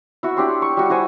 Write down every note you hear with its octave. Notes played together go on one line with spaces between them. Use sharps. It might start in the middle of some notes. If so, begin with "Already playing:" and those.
E4 F#4
D4 G4 C6
C#6
G3 F#4
E4 F#4 C5 G#5